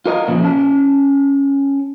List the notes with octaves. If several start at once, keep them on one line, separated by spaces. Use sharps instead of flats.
F4 A#4 D#5
A#2 C#3 F3
C#4 A5